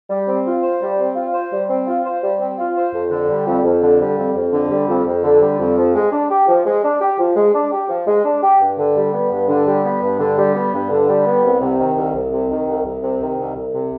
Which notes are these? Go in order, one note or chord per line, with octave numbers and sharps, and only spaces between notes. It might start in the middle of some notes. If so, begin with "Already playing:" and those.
G3
C4
F4
C5
G3
C4
F4
C5
G3
C4
F4
C5
G3
C4
F4
C5
F2
D3
G3
F2
F2
D3
G3
F2
F2
D3
G3
F2
F2
D3
G3
F2
F3
G#3
D4
G4
F3
G#3
D4
G4
F3
G#3
D4
G4
F3
G#3
D4
G4
G2
D3
G3
B3
G2
D3
G3
B3
G2
D3
G3
B3
G2
D3
G3
B3
C2
C3
D#3
C2
C2
C3
D#3
C2
C2
C3
D#3
C2
C2
C3